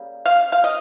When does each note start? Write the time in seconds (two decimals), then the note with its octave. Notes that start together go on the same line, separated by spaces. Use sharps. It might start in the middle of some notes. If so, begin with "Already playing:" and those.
Already playing: C#3 G3 A#3
0.26 F5
0.52 F5
0.64 D#5